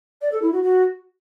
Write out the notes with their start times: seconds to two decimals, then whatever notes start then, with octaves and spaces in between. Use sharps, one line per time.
0.21 D5
0.32 A4
0.42 E4
0.52 F#4
0.62 F#4